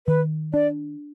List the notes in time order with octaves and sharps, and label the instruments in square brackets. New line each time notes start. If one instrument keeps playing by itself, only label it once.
[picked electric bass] D#3 [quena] B4
[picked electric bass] D4 [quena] D5